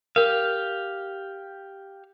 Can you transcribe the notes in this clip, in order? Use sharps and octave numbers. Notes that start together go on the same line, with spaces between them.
G4 A#4 F5